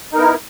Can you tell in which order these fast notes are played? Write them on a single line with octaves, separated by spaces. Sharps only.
D#4 A#4 B3 E4